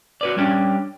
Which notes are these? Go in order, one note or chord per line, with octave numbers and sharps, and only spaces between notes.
F#4 B4 D5
G3 C#4 D4 G4